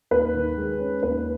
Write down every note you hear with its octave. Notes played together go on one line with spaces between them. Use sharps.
D#2 B4
D#3
G#3
C#4
D#2 B4